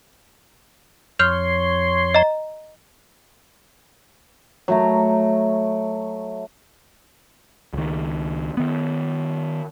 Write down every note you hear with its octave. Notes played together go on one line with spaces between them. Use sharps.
F2 C#5 C6 F6 G6 F7
D#5 A#5
F#3 A3 A#5
C#2 D#3
D#3 B3